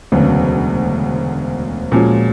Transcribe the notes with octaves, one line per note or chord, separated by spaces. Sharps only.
E1 D2 C#3 F#3 B3
A#2 F3 G#3 C#4 F#4